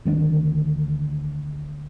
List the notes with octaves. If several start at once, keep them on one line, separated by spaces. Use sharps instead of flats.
D2 D#3 G#3 D4